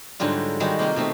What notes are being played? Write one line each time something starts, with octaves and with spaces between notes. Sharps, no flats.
G#2 D3 F#3 G3 F4
D#3 G3 G#3 F#4
C3 A#3 F4 C5
B2 D#3 A3 C4